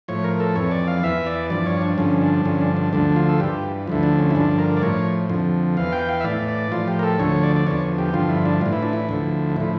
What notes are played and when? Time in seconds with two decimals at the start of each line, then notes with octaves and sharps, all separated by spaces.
0.08 A2 F3 C#5
0.24 A#4
0.40 A4
0.55 F2 E3 C#5
0.71 D5
0.87 F5
1.03 E2 E3 E5
1.27 D5
1.50 G2 F3 D5
1.66 C#5
1.82 D4
1.98 G2 D3 F3 C#4
2.21 D4
2.45 G2 D3 F3 C#4
2.61 D4
2.77 D4
2.93 D2 D3 F3 D4
3.16 F4
3.29 A4
3.40 G2 E3 G4
3.87 D2 D3 F3 E4
4.03 D4
4.19 C#4
4.30 E4
4.35 G2 D3 F3 D4
4.59 A#4
4.77 D5
4.82 A2 F3 C#5
5.29 F2 D3 F3
5.77 E2 E3 F5
5.92 G5
6.09 F5
6.20 E5
6.24 A2 E3 D5
6.48 D5
6.72 A2 F3 F4
6.88 G4
6.99 A#4
7.03 A4
7.19 D2 D3 F3 C#5
7.43 D5
7.56 D5
7.67 E2 D3 F3 C#5
7.98 G4
8.14 G2 D3 F3 F4
8.30 E4
8.45 D4
8.61 A2 E3 F4
8.73 E4
8.83 D4
8.93 E4
9.09 D2 D3 F3
9.56 A2 F3 E4